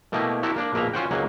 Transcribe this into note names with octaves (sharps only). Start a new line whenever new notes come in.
B2 A3 A#3 E4 G4 D#5
E4 F#4 G4 A4 A#4
A#3 D4 D5
A#1 B2 A#3 B4 E5 A#5
C#4 F4 F#4 C5 F#5 G5
C#2 G#2 F#3 A#3 F#5 G#5